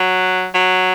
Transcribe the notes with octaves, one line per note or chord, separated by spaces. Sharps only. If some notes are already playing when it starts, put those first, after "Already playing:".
Already playing: F#3
F#3